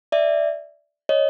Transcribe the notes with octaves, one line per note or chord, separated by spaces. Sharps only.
D5 E5
C#5 D#5